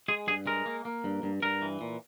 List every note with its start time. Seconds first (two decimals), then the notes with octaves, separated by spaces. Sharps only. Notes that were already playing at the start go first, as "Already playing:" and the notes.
0.08 G#3 G#4
0.27 G2 G#4
0.47 G#3 A#4
0.66 A#3
0.85 A#3
1.04 G2
1.23 G2
1.43 G2 A#4
1.62 E3
1.81 A#2